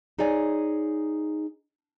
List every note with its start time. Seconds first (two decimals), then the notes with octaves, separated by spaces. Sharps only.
0.19 D#4 G#4 C#5 D5 G#5